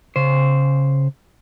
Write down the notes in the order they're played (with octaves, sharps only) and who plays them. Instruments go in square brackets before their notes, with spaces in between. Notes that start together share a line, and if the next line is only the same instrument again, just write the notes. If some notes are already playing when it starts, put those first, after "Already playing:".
[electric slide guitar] C#3 C5